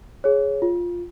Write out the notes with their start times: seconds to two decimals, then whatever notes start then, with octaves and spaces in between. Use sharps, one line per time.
0.24 G#4 C#5
0.62 F4